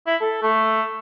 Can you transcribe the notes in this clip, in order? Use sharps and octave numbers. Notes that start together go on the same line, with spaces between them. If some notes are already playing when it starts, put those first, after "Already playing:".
E4
A4
A3